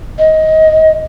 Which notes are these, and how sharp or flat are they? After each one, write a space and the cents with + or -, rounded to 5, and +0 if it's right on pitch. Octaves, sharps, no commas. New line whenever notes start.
D#5 +15